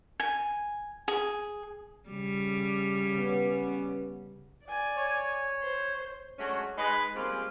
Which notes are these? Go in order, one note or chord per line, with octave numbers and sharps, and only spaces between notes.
G#5
G#4
C#3 G3
B3 C#4
D5 G#5
C#5
C5
F#3 G#3 A3 C#4 D4 F#4
G#3 D#4 B4
G3 G#3 A#3 C4 C#4 F4